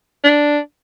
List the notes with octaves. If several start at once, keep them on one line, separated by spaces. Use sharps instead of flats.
D4